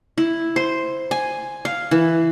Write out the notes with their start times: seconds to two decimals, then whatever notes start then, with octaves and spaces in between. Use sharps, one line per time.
0.18 E4
0.56 C5
1.11 G#5
1.65 F5
1.91 E3